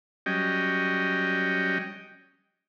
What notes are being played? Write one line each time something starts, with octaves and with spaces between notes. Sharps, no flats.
F#3 G3 C#4 D#5 G5